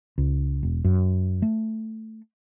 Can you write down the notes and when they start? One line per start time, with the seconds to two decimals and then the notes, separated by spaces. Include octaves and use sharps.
0.18 C#2
0.63 E1
0.84 F#2
1.42 A3